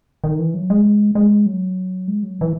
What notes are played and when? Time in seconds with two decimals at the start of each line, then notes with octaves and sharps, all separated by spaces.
0.24 D#3
0.39 E3
0.54 F#3
0.70 G#3
1.15 G#3
1.46 F#3
2.07 G#3
2.23 F#3
2.41 E3